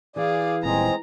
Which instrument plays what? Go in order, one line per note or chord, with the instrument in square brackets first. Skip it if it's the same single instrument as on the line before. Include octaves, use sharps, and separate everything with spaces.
[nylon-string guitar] E3 [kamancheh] G#4 F5 [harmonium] D5
[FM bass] D#1 [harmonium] G#3 C4 G#4 [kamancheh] A#5